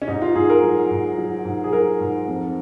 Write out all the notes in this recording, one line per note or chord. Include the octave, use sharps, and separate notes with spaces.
C#4
G#2 D#4
F4
G#2 G#4
A#4
F#3
G#2
F#3
G#2
G#4
F#3 A#4
G#2
F2